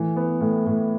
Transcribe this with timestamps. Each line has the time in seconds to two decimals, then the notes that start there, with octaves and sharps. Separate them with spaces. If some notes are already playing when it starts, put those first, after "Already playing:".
Already playing: A2 E3
0.16 B3
0.40 A2
0.66 A2